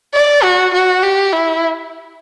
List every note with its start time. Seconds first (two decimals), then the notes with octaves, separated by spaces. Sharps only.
0.14 D5
0.43 F#4
0.74 F#4
1.03 G4
1.33 E4